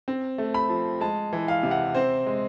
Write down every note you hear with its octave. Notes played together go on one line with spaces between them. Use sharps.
C4
A3
B5
F3
G#3 A5
E3
F5
C3
F#5
C4 C5
G#3